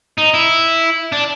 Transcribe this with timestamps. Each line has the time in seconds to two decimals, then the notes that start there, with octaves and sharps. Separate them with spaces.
0.18 D#4
0.34 E4
1.12 D4